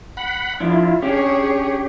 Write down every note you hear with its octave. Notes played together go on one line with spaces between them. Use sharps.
F#5 B5
F3 D4 E4 F4
C#4 D4 G4 G#4 C#5